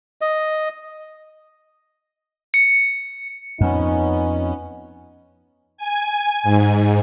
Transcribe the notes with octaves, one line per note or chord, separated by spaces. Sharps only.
D#5
C#7
F2 B3 C#4 D#4
G#5
G#2